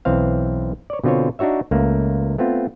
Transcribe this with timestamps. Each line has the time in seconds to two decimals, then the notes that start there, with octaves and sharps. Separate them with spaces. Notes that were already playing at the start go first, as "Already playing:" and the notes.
0.05 B1 E3 C4 C5 F5
0.90 C#5 D5
1.04 B2 D3 C4 F4 C5 C#5
1.39 D4 D#4 F#4 C#5 E5
1.71 C#2 A3 A#3
2.38 A3 B3 C4 F4